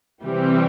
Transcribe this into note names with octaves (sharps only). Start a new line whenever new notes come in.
C3 E3 G3 C4 G4